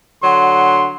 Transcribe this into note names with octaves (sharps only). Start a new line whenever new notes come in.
D3 F#3 F#5 C6